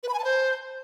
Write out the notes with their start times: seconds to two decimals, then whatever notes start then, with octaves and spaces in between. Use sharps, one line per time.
0.03 B4
0.09 B5
0.14 G#5
0.19 A5
0.24 C5